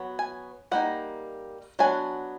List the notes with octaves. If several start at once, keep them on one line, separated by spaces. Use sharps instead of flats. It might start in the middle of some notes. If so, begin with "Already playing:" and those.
Already playing: F#3 B3
G#5
G3 A#3 D#4 F#5
F#3 B3 D4 G#5